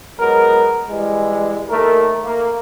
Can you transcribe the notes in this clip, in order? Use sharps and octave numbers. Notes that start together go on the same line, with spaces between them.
F#3 G#3 B3 A#4
E3 G3 G#3
D#2 A3 A#4
A#3